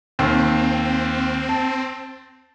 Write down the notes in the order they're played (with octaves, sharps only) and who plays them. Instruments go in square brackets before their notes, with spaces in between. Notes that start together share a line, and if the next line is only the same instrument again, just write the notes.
[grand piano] D#2 [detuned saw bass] C4
[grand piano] A5